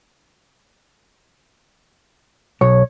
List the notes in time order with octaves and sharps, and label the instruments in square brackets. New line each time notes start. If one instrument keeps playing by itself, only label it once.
[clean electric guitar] B1 [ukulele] C#5